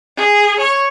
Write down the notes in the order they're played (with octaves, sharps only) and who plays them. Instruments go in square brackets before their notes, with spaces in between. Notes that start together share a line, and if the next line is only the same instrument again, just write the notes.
[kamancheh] G#4
C#5